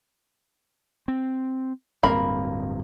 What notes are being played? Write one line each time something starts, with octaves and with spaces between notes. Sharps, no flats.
C4
D1 G2 A#3 C4 B5